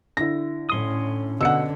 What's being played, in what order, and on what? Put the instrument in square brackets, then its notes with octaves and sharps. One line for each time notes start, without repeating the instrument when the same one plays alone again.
[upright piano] D3 E4 [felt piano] A#6
[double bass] A2 [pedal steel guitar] C#4 C6 D#6
[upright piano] B2 C#7 [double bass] D3 [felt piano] F#5 E6